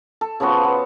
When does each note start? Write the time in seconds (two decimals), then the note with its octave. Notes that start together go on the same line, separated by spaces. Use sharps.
0.21 A4
0.40 C#3 F3 B3 F#4
0.64 B3